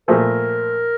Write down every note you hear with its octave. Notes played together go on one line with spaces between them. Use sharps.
A#2 F3 A3 A#4